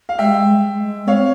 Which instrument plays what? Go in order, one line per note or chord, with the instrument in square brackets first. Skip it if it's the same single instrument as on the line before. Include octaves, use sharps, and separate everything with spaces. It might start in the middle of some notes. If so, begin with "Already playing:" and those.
[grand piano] F5
[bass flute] G#3 [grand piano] E5 G5
[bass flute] G#3
G#3
[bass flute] C4 [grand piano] C#5 F5